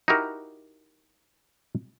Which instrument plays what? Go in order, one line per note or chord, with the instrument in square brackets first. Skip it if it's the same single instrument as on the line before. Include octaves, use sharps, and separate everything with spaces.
[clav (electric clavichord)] D#4 E4 F#4 G4 A#4